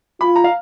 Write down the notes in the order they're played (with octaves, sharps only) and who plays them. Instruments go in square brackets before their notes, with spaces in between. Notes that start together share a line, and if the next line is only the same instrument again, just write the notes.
[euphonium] F4 [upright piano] B5
[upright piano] A#5
F5